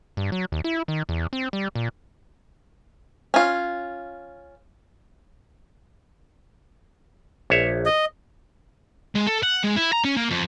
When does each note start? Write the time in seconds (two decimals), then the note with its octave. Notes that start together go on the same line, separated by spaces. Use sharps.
0.17 G2
0.32 F#3
0.52 D#2
0.64 E4
0.88 D#3
1.09 E2
1.33 C4
1.53 G3
1.75 A#2
3.34 C#4 F4
7.50 A#1 C#5 E5
7.86 D#5
9.15 G#3
9.27 A4
9.43 F#5
9.64 G#3
9.76 E4
9.93 A#5
10.05 C#4
10.17 A#3
10.30 F2